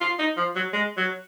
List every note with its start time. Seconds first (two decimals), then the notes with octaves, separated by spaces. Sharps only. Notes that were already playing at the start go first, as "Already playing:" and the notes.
0.01 F4
0.19 D#4
0.37 F3
0.55 F#3
0.73 G#3
0.97 F#3